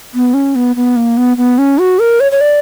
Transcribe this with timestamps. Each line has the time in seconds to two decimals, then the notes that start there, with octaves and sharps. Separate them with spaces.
0.14 B3
0.34 C#4
0.55 B3
0.76 B3
0.96 A#3
1.17 B3
1.37 B3
1.58 C#4
1.79 F#4
1.99 A#4
2.20 C#5
2.32 C#5
2.41 D5